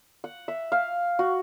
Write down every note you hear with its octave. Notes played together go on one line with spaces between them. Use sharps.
F#5
E5
F5
F#4